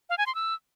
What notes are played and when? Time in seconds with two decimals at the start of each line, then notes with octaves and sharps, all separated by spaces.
0.10 F5
0.18 G#5
0.26 C6
0.35 E6